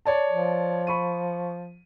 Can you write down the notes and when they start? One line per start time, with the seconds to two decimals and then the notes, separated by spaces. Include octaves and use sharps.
0.06 C#5 D5 A5
0.30 F3
0.87 B5 C#6 D#7